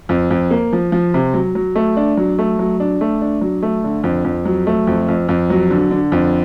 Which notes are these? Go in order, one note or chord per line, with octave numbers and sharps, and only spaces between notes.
F2
F2
A#3
F3
F3
C3
F#3
F#3
A3
D4
F#3
A3
F#3
D4
A3
D4
F#3
A3
D3
F2
F2
F#3
A3
F2
F2
F2
F#3
D3
D3
F2